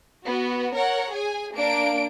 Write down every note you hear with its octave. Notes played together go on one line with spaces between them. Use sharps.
B3 F#4
A#4 C#5 F#5
G#4 G#5
A#3 D4 D7